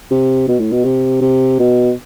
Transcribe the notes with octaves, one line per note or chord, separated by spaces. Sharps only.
C3
B2
A2
B2
C3
C3
B2